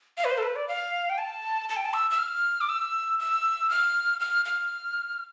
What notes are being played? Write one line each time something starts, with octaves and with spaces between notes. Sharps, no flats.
F5
B4
C5
A4
B4
D5
F5
G5
A5
A5
G5
A5
E6
E6
F6
D6
E6
E6
F6
F6
F6